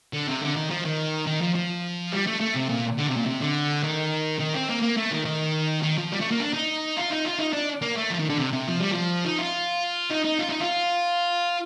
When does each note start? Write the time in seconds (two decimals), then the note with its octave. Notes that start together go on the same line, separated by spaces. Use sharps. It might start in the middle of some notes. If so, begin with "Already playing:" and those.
0.13 D3
0.27 C3
0.41 D3
0.56 D#3
0.70 F3
0.85 D#3
1.27 D#3
1.41 F3
1.55 F3
2.12 G3
2.27 A3
2.41 A3
2.55 C3
2.70 A#2
2.98 D3
3.08 C3
3.17 A#2
3.26 C3
3.41 D3
3.84 D#3
4.40 D#3
4.54 C4
4.69 A#3
4.83 A#3
4.97 A3
5.11 D#3
5.25 D#3
5.82 D#3
5.97 F3
6.12 G3
6.20 A3
6.31 A#3
6.40 D4
6.53 D#4
6.97 F4
7.11 D#4
7.25 F4
7.39 D#4
7.53 D4
7.82 A#3
7.97 A3
8.10 F3
8.19 D#3
8.29 D3
8.38 C3
8.53 C3
8.68 F3
8.80 G3
8.92 F3
9.25 D#4
9.39 F4
10.10 D#4
10.25 D#4
10.39 F4
10.49 D#4
10.61 F4